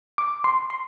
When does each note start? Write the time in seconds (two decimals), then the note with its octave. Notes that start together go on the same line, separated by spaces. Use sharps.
0.18 D6
0.44 C6
0.70 C6